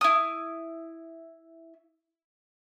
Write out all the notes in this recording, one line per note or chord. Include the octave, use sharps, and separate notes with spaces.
E4 D#6